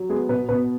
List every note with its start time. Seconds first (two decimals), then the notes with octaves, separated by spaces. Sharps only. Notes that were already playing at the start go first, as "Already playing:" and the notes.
Already playing: F#3
0.09 G#3 B3 G#4
0.29 B2 B3 B4
0.49 B2 B3 B4